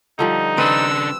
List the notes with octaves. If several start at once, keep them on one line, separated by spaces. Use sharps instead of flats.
D3 F3 G3 D#4
C#3 C4 D4 B4 E6